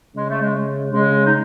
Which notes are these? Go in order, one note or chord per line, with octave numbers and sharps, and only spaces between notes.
C#3 G#3
A3
G#3
C#3 G#3
D#4